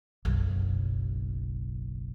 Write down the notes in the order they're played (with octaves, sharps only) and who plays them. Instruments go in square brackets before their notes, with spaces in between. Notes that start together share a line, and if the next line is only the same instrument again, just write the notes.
[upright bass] F#1 B1